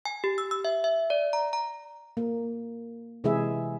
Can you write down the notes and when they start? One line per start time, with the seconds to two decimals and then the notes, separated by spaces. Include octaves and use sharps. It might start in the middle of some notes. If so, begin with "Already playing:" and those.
0.05 G#5
0.24 G4
0.38 E6
0.51 E6
0.65 E5
0.84 E5
1.10 D5
1.33 A#5
1.53 A#5
2.17 A#3
3.24 C3 E3 G#3 E4 G#4 E5